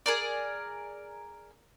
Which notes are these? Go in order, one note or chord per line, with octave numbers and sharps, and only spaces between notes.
G#4 A#4 D5